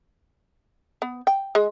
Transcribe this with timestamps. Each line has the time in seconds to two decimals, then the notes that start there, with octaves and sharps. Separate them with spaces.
1.02 B3
1.27 G5
1.55 G#3